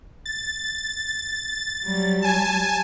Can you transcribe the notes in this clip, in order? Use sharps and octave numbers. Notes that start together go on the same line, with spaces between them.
A6
F#3 G3
G#5 A5